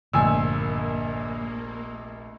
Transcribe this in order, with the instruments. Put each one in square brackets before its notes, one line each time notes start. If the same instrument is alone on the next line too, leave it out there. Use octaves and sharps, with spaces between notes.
[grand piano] F1 A#1 [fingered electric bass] G2 D3 F3 [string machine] A#3 [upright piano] G#5 E6